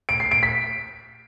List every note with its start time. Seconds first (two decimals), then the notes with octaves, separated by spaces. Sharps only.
0.09 D7
0.20 C7
0.31 D7
0.43 B6